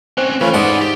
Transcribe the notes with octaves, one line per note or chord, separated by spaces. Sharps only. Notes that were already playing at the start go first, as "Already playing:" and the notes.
C4 C#4 C5
E3 A3 C#4 F4 B4
G#2 E4 D5 F#5 G#5 C6 D#6
G4